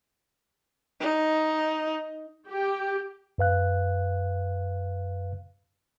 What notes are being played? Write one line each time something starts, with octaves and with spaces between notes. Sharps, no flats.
D#4
G4
F#2 B4 F5 F#6